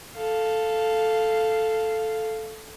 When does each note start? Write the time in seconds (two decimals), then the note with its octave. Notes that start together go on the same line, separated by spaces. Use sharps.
0.17 A4 F5